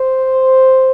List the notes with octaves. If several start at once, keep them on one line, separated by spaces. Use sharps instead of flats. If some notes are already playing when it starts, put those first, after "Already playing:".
Already playing: C5